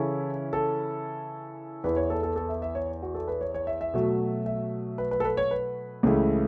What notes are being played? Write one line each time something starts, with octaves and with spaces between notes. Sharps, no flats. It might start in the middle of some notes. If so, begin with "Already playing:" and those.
Already playing: C#3 E3 C#4 E4 A4
A4
E2 E3 B3 E4 B4
C#5
A4
A4
A4
E5
E5
C#5
F#4
A4
B4
C#5
C#5
E5
E5
B2 F#3 A3
E5
B4
B4
A4
B4
C#5
B4
C#2 C#3 E3 A3